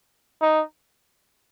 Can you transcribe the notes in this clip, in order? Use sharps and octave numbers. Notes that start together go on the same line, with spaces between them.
D#4